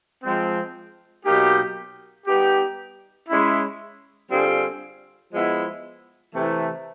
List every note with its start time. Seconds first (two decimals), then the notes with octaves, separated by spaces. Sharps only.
0.23 F3 G#3 C4
1.25 B2 F#3 A#3 D#4 G4
2.26 G3 B3 D#4 G4
3.28 G#3 C#4 E4
4.30 D3 G3 C4 F4 G#4
5.31 F3 G#3 B3 E4
6.34 C3 E3 A3